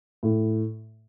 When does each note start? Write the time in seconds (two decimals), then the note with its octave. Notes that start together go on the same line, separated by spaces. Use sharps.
0.23 A2